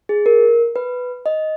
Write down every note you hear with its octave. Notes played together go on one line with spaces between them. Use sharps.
G#4
A#4
B4
D#5